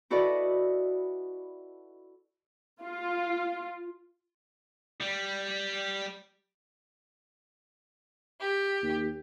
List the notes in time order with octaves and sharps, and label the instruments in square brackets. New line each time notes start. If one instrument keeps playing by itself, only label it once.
[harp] E4 F#4 A4 B4 D5 D#5
[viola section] F4
[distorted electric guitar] G3
[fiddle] G4
[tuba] D#2